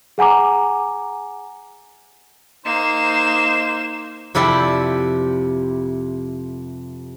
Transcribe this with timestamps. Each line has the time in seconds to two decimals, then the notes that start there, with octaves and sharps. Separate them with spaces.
0.18 G#4 F#5 G#5 A#5 D6
2.66 A#3 D#4 C5 E7
4.35 F2 C3 E4 D5 G5